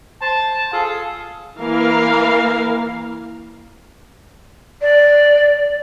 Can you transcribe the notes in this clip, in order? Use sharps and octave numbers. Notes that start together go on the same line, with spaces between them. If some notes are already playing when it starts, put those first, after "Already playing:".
C5 A5
F4 G#4 A4 F5
E3 A#3 A#4 F5
D5